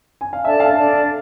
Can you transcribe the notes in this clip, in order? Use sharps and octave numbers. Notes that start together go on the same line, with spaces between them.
G#5
F5
D4 A4 D5 E5 A5
F5
D4 A4 D5 A5